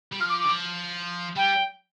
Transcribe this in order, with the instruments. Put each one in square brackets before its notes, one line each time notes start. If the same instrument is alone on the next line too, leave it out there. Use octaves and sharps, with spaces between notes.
[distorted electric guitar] G3
[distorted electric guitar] F3 [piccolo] F6
[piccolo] D6
D6
[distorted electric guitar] D3
F3
[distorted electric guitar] G3 [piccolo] G5